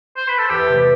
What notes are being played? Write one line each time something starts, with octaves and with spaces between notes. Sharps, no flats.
C5
B4
A4
E2 G4
C3 E3 A3